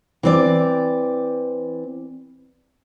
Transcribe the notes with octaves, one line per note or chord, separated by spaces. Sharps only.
E3 C4 D5